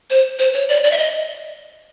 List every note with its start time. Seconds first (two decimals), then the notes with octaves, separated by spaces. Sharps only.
0.10 C5
0.39 C5
0.54 C#5
0.69 D5
0.84 D5
0.91 E5
0.97 D#5